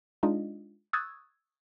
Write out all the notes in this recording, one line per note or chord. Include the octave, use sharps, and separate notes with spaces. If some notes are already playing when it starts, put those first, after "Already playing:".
G#3 D4 D#4 F4 D#5
C#6 D#6 E6 F#6 G#6 A6